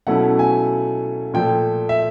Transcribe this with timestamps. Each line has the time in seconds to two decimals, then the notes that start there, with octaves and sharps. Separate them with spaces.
0.07 B2 F#3 A3 C#4 E4 F#5
0.39 G#5
1.34 A#2 F3 A3 G5
1.89 E5